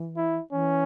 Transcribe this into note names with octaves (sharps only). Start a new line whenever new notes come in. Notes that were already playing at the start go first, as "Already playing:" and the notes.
Already playing: E3
E4
E3 C#4